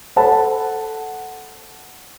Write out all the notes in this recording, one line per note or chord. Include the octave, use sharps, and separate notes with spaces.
A4 C5 F#5 A5 B5